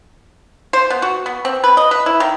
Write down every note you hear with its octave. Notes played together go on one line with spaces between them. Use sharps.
C5
B3
F#4
B3
C4
B4
D#5
B4
E4
D#3